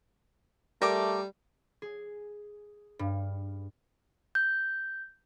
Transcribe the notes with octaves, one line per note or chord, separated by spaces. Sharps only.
G3 A3 A#4 D6
G#4
G2
G6